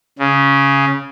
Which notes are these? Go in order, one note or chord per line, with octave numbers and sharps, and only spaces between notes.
C#3